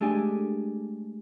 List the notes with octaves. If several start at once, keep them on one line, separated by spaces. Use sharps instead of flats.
G#3 A3 D4 G4 G#5